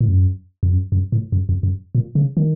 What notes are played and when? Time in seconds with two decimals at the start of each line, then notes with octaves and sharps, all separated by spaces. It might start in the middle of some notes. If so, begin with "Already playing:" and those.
0.01 A2
0.08 F#2
0.63 F2
0.71 F#2
0.92 F#2
1.12 A2
1.32 F#2
1.49 F2
1.63 F#2
1.95 A#2
2.15 C#3
2.37 D#3